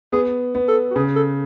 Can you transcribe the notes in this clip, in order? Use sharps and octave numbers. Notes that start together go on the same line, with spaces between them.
B3 G#4
B3
A4
F#4
C#3 G#4
A4